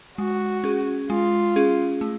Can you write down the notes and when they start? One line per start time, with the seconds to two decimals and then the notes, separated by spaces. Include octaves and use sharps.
0.18 G#3 F#4
0.64 C#4 G#4
1.10 G#3 F4
1.56 C#4 G#4
2.01 A3